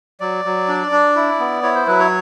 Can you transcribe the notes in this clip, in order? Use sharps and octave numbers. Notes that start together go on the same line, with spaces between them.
F#3 D5
F#3
D4
D4
E4
B3
E4 C#5
C5
F#3 B4
C#5